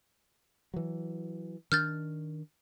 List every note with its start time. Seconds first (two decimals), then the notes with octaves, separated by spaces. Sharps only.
0.74 E3 F#3
1.72 D#3 D4 F6 G6 A6